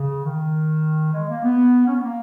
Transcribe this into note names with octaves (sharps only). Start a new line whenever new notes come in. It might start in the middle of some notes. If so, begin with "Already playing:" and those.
Already playing: C#3
D#3
G#3
A#3
B3
C#4
B3
A#3